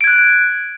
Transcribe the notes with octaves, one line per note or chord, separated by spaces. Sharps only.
F#6 G#6 D7